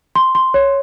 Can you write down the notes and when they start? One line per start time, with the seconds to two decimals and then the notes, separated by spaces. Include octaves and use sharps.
0.15 C6
0.35 C6
0.54 C#5